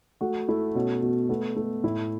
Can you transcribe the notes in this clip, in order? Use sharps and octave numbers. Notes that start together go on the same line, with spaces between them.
A3 F#4
A3 E4
B2 C#4
B2
A3 B3
A3
A2 E4